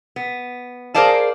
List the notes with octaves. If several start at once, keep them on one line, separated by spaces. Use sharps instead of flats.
B3
G#4 A#4 C5 D5 F5 A5